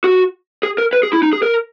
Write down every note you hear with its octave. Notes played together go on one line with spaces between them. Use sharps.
F#4
G#4
A#4
B4
G#4
E4
D#4
G#4
A#4